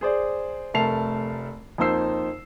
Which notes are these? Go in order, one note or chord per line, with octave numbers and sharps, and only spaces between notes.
G#4 C5 D5
F1 A3 A#4 A5 C7 F7
F2 A#3 D#4 C5 E6 C7